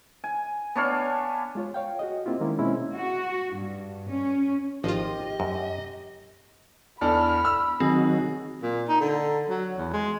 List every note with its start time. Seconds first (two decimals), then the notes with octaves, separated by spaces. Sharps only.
0.24 G#5
0.76 B3 D4 C#5 F5
1.55 G#3 F4 C#5
1.74 C#5 F5 G5
1.99 F#4 G#4 D#5
2.25 A#3 C4 E4 F4 G4
2.40 D#3 G#3 A#3 C#4 E4
2.59 B2 G#3 C4 C#4 E4
2.94 F#4
3.54 G2
4.09 C#4
4.84 G#1 F3 F4 G4 D#5
5.40 F#2
7.01 E2 D4 A4 B5 F6
7.45 E6
7.80 D#3 F#3 C4 G#4
8.62 A#2
8.88 D#4
9.01 D3
9.49 F#3
9.78 E2
9.93 G#3